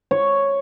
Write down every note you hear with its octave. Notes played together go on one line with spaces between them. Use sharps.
C#5